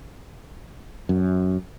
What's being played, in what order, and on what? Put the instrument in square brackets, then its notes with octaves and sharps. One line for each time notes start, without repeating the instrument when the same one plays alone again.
[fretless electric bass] F#2